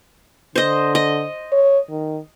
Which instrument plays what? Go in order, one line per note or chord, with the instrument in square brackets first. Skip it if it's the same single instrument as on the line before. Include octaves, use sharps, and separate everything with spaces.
[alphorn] D3 [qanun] C5 D#5
[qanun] D#5
[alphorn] C#5
D#3